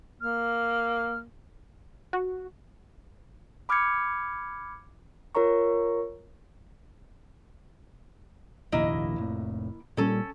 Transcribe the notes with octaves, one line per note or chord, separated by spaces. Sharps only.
A#3 F6
F#4
B5 D6 F6 G6 G#6 C#7
F4 A#4 C#5 A#5 C#6
F1 A#1 D#2 A#3 E4 D#5
F1 A2
A#2 G3 C#4 A4